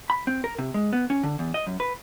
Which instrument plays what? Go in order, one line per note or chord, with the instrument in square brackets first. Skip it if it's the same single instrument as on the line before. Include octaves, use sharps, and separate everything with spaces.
[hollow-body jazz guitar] B5
C4
A#4
C3
G#3
B3
C#4
D3
E2
D#5
F#2
B4